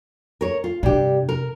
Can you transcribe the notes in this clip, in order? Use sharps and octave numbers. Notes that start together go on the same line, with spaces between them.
A#4 C#5
F4
G2 C3 G4
A#4